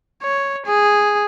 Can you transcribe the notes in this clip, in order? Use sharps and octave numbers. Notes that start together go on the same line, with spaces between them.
C#5
G#4